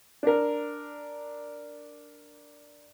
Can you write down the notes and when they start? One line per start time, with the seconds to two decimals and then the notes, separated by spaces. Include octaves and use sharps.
0.23 D4 A#4